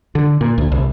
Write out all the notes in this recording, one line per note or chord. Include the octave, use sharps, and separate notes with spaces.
D3
A#2
D2
C2